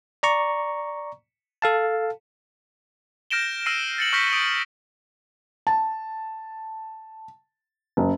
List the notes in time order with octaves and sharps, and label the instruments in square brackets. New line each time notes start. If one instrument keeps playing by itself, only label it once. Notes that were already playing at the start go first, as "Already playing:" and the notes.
[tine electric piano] D5 A#5 C#6
A4 F5 A5
[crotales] F6 G6 A#6 D7 E7 G7
E6 F6 A#6 C7 D#7
A6 C#7 F#7
C#6 F6 G6 A#6 B6 C#7
D#6 G6 D7
[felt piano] A5
F#1